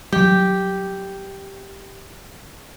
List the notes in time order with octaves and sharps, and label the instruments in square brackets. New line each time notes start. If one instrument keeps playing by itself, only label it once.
[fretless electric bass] F#3 G3 [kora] G4